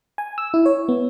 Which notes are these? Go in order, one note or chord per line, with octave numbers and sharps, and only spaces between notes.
G#5
E6
E4
C#5
B3